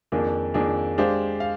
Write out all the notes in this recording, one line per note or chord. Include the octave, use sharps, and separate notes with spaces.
F2 D#3 A#3 D4 G#4
F2 D#3 A#3 D4 G#4
G#3 D4 G4 C5 F5
F5